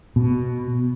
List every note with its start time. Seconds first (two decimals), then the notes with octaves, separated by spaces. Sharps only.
0.16 B2